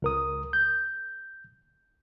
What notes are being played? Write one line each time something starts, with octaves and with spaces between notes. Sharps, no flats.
C#2 A#4 D#6
G6